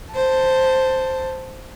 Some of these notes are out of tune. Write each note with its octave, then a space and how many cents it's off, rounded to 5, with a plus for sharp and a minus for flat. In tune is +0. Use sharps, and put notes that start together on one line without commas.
C5 +0 A5 +10